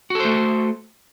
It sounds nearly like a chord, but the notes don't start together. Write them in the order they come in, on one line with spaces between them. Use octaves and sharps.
F#4 A4 C5 A3